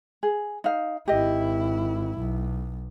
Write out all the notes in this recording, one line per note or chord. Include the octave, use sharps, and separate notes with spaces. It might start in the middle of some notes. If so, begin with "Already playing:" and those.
G#4
D#4 F5
G#1 E4 G4 D#5
B1